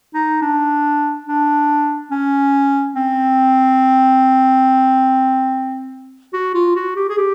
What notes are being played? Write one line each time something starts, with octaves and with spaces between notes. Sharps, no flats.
D#4
D4
D4
C#4
C4
F#4
F4
F#4
G4
G#4
G4